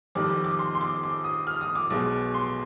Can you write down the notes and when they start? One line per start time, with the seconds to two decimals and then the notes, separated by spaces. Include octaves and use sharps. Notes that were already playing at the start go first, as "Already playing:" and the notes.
0.15 F2 D#3 G3 D6
0.30 D6
0.44 D6
0.59 C6
0.75 C6
0.81 D6
1.03 D6
1.24 D#6
1.47 F6
1.61 D#6
1.75 D6
1.90 B1 B2 G#3
2.34 C6